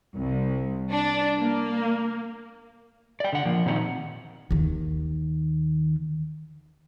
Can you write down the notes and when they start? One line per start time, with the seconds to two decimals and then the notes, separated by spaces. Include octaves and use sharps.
0.14 C2
0.91 D4
1.40 A#3
3.20 D5 G5
3.33 D3 F#5
3.45 F3 A#3
3.65 A#2 D#3 C4 D#4 C5 F#5
4.51 D#2 D#3